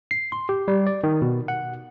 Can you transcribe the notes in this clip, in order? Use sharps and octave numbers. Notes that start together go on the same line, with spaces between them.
C7
C6
G4
G3
D5
D#3
B2
F#5